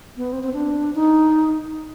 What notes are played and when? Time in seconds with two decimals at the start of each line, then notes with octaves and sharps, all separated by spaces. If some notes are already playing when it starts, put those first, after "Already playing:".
0.17 B3
0.33 C4
0.43 C4
0.53 D4
0.95 D#4